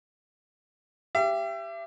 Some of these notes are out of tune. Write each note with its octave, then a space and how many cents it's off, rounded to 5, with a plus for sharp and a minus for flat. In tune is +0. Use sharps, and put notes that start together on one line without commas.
G4 +0 E5 +35